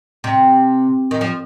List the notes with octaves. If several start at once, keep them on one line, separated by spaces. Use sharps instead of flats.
C3
D#3
F3